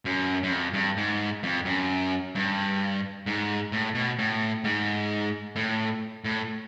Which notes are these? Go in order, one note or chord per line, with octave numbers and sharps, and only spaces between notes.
F#2
F#2
F2
G2
G#2
F2
F#2
G2
G#2
A2
B2
A2
G#2
A2
A2